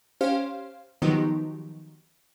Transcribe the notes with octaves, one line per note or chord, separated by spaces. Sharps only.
C#4 G4 C5 F5
D#3 F3 F#3 B3 D#4 G4